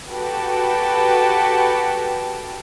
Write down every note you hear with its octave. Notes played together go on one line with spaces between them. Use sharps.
F#4 G4 A4 B4 G5 A5